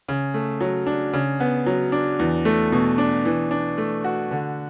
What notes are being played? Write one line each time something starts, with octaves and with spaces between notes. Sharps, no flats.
C#3
A3
F#3
D4
C#3
B3
F#3
D4
E2
A3
B2
D4
E3
D4
A3
F#4
D3